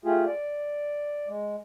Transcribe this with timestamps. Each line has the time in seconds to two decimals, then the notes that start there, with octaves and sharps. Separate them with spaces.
0.05 A3 F4 G4 G#4
0.26 D5
1.28 G#3